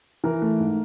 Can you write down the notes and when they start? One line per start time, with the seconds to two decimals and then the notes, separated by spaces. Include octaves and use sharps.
0.24 E3 A#4
0.42 A3
0.59 G#2